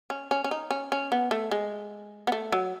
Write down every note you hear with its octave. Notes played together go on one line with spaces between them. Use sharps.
C#4
C#4
C#4
D#4
C#4
C#4
B3
A3
G#3
B3
A3
F#3